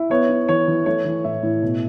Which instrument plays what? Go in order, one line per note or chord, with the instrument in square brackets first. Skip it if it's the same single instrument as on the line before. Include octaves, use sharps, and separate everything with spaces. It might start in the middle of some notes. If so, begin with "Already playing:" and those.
Already playing: [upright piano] E4
B3 C#5
E4
E3 C#5
E3
A3 C#5
E3
A2 E5
A2
B2